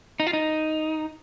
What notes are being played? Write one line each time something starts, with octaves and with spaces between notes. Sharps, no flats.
D#4
F4
D#4